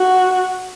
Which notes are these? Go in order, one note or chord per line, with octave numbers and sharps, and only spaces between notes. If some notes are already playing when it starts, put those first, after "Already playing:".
Already playing: F#4